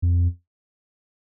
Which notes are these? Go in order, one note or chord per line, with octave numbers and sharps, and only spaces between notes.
F2